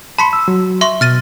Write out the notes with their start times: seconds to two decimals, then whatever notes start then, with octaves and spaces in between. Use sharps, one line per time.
0.18 A5 B5 C6 B6 C#7
0.33 E6
0.48 F#3
0.81 E5 C6 C#6
1.01 B2 F6 A6 D#7